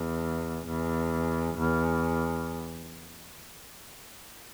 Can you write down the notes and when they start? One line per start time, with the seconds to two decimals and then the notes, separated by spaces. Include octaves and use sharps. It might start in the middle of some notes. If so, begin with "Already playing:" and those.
Already playing: E2
0.66 E2
1.58 E2